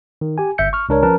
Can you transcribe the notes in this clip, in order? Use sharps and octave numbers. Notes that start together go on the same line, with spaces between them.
D#3
G4 G#5
G1 E5 G6 C#7
C#6 F6
C#2 D4 A#4 C#5
F3 C#4 A#4 B4 A5